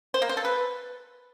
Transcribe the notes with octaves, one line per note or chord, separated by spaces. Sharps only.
C5
A#3
C5
A4
B4